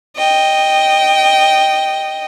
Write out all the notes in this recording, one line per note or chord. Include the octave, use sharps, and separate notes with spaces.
D#5 G5